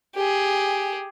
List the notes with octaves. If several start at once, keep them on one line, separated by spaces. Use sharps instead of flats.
G4 G#4